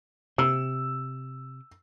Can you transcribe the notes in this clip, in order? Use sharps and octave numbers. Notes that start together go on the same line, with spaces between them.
C3 E6